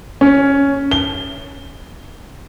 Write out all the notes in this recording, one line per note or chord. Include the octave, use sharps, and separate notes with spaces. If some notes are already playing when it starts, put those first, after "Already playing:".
C#4
G7